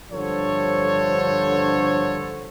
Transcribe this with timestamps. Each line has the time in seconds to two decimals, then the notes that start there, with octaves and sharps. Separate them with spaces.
0.12 G2 D3 F3 A4 C5 C#5